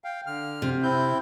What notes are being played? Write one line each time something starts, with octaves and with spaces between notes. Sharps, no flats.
F5 G5
D3 F6
C3
C4 E4 G6